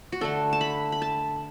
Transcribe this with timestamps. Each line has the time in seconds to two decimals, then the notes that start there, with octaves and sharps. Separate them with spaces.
0.12 F#4
0.21 D3 A3 D4 A4
0.53 A5
0.61 B5
0.92 B5
1.02 A5